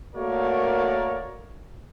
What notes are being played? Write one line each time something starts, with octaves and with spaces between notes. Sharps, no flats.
A3 A#3 F#4 A#4 C#5 D5